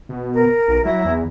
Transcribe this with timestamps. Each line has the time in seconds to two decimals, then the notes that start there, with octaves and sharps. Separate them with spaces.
0.09 B2
0.33 A#4
0.68 B1
0.85 F#3 E4 A#5
1.04 E2